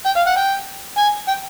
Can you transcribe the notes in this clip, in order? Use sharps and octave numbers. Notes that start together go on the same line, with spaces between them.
G5
F5
F#5
G5
G#5
G5